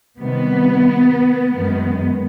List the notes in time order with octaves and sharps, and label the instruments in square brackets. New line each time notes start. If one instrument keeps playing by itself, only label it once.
[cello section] C3 D#3 G3 B3
F#2 D#3 G#3 B3